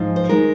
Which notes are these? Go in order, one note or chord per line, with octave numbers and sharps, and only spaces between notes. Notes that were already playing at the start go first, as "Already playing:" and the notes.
Already playing: G#2 F3 G#3
C5
D#3 G#3 A#4